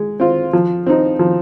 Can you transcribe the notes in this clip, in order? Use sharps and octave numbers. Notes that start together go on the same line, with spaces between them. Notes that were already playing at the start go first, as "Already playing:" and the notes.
Already playing: G#3
C4 F4
F3
C4 D#4
F3